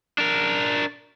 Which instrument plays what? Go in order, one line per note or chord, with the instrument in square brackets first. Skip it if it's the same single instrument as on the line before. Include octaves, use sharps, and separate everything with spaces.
[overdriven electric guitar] D4 A#4